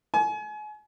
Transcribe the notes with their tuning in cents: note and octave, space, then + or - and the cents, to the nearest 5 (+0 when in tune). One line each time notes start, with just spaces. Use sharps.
G#5 +35